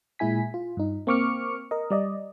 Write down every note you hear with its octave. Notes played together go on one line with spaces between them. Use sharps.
A#2 G#3 E4 G#5 B6
F4
G2 D#4
A#3 C4 C#6 D6 F6 C#7
A#4 D#5
G3 D5 D#5